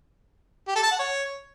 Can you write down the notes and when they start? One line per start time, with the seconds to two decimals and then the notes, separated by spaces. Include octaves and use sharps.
0.68 G4
0.75 A4
0.83 A5
0.91 F#5
0.99 C#5